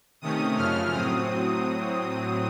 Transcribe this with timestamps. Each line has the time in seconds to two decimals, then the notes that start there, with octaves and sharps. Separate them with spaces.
0.21 C3 D#3 A3 C#4 D#6
0.57 F#2 C#3 F3 A3 C#4 F6
0.93 A2 F#3 C4 D#6